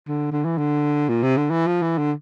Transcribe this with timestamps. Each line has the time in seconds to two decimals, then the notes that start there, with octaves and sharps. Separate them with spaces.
0.08 D3
0.32 D3
0.45 E3
0.58 D3
1.09 A#2
1.23 C3
1.37 D3
1.50 E3
1.66 F3
1.82 E3
1.98 D3